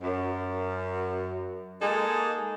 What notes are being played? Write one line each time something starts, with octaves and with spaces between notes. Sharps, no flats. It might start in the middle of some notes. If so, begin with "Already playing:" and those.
F#2
G#3 A#3 D#4 G#4 A4